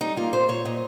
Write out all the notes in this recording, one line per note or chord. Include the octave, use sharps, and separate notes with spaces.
G3 D#4
A#3 F4
A#2 C5
A#2 C#5
A#2 D#5